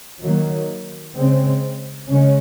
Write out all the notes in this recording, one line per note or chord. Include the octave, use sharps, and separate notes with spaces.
D#3 F#3 A#3
C#3 G#3 C4
C#3 G#3 C#4